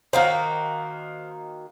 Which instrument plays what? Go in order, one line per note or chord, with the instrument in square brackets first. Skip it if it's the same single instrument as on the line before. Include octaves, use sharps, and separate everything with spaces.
[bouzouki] D#3 A#3 F#4 [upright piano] C5 F5